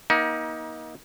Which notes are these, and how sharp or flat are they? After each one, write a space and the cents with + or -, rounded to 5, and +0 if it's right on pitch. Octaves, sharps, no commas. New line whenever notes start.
A#3 +40 D#4 +25 G5 -25